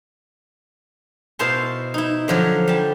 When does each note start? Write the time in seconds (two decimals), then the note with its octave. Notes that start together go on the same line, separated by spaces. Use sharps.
1.39 B2 E4 C5 F5 A5 C6
1.94 D#4 E4
2.28 D3 F3 F#3
2.68 G3 A5